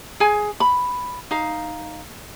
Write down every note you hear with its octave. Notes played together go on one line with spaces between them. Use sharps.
G#4 G#5
B5
D#4 F5